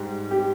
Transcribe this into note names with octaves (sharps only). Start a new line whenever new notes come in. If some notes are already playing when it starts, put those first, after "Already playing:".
Already playing: G#2 G3
G4